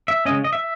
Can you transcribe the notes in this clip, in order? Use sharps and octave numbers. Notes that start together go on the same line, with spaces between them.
E5
C#3 G#3 C#4 D#5
D#5
E5